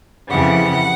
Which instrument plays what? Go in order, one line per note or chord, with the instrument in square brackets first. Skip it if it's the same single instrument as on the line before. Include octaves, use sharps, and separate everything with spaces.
[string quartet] F2 C#3 E3 G3 F#5